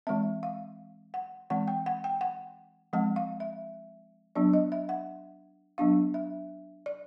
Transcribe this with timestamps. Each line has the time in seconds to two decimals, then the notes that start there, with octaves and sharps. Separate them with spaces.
0.07 E3 G#3 C4 E5
0.43 F5
1.14 F#5
1.50 E3 G#3 C4 F#5
1.68 G5
1.86 F#5
2.04 G5
2.21 F#5
2.93 F3 G#3 C4 F#5
3.16 F5
3.40 E5
4.35 F#3 B3 D4 D5
4.54 D#5
4.72 E5
4.89 F#5
5.78 F#3 B3 D4 F5
6.14 E5
6.86 D5